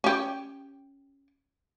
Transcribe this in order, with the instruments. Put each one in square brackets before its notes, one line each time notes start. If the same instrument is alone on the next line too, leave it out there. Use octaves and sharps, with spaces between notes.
[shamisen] C#4 G4